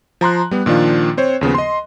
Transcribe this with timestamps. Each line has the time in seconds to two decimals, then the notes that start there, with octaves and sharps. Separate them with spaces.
0.21 F3 A#5 C6 F#6
0.51 G3 B3
0.66 A#2 D#3 F3 D4 F4
1.17 C4 C5 C#5
1.41 D#2 C#3 F3 B3
1.55 D#5 C6